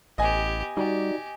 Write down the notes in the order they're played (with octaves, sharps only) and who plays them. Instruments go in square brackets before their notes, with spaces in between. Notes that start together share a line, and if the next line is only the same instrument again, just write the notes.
[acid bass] A1 [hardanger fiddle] B3 G4 [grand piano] D#5 G#5
[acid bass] G3 [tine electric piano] D#4 F#4 D5 [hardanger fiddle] G4